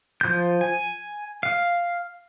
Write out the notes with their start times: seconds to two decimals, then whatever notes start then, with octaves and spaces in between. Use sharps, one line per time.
0.21 F3 G6
0.61 G#5
1.43 F5